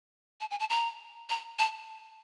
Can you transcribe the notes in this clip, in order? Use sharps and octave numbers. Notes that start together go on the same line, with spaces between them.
A5
G#5
A5
A#5
A#5
A5